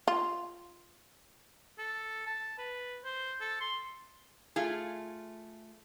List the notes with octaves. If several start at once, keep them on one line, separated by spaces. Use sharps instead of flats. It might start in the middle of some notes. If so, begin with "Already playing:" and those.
F4
A4
A5
B4
C5
A4
C6
A3 F4 G#4